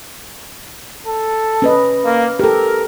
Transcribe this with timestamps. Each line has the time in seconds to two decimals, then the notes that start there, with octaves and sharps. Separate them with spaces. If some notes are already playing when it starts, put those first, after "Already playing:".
1.06 A4
1.62 C#4 B4 D#5
2.05 A#3
2.39 G4 A4 A#4